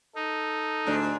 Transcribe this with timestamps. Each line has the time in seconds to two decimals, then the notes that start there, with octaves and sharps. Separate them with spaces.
0.16 D#4 A4
0.87 D2 G#2 D4